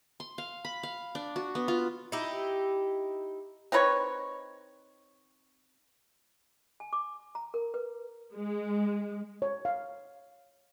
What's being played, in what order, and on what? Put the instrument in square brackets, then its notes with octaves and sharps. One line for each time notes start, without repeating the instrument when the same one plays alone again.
[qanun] C6
F5
B5
F5
D4
F#4
B3
F4
[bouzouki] D#4 E4 G4
[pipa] C4 D#4 B4 C#5
[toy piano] G#5
D6
A#5
A#4
B4
[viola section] G#3
[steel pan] C#5
F5